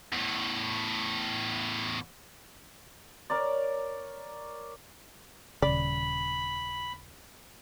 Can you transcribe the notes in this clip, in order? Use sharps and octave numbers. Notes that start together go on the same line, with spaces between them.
E2 A2
A#4 C#5 D5
D#1 G#1 C#3 D5 B5